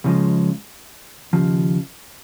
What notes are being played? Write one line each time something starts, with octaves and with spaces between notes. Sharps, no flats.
C#2 C#3 F3 G#3
D#2 C#3 F3